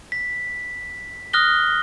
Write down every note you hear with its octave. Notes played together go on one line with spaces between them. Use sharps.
B6
D#6 F6 F#6 A#6 G7